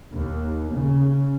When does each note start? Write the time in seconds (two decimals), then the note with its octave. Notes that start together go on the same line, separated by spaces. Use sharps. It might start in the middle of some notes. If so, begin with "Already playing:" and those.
0.12 D#2
0.72 C#3